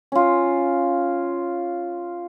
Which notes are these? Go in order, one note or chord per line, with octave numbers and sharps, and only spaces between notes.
C#4 F4